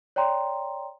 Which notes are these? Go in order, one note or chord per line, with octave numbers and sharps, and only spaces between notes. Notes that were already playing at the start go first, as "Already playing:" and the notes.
C#5 D5 G5 A#5 C6